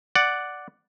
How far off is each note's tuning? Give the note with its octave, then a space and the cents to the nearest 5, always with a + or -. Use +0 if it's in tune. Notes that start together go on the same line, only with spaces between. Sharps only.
D5 +0 F#5 +0